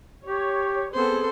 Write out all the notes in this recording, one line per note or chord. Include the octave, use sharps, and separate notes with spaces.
G4 C#5
B3 C4 G#4 A4 C5